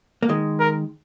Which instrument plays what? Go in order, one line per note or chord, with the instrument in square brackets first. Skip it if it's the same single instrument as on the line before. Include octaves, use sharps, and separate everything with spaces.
[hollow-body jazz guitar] A#3
D#3 G#3
[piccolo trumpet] A#4